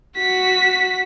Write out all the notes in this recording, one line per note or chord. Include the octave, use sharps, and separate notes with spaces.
F#4 B6